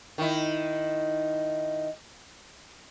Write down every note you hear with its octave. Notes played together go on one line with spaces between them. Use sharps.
D#3 E4